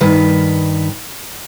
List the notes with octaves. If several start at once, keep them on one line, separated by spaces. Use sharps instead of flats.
G2 D#3 B4